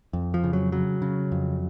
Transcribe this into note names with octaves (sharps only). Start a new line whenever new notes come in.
F2
F3
C#3
F#3
C#3 F#3
C#3
F2